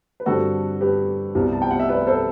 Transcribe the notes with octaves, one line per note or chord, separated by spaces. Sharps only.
B4
G2 D3 G3 C4 F#4 A4
G4 B4
C2 C3 G3 B3
A5
G5
F#5
E5
B4 D5
A4 C5